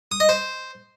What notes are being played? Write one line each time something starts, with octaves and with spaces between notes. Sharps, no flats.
D#6
D#5
C5